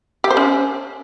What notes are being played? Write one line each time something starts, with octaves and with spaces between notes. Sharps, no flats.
G4
C5
C#4